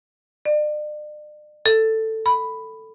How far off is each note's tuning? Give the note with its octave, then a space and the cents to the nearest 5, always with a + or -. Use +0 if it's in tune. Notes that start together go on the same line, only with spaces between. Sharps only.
D5 +40
A4 +10
B5 +5